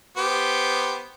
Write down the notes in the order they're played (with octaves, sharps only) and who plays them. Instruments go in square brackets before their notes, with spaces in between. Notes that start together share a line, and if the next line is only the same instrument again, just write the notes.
[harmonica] B3 G4 C5